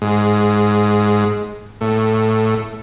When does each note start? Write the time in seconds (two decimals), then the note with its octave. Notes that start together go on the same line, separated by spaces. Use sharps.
0.02 G#2
1.81 A2